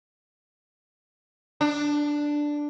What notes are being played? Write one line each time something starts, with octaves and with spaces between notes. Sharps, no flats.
D4